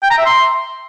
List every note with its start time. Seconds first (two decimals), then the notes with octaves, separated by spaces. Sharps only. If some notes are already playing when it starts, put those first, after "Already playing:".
0.03 G5
0.11 A#5
0.18 E5
0.26 C6